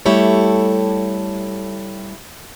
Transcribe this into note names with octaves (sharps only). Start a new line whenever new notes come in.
G3 A3 E4 G4 A4 C#5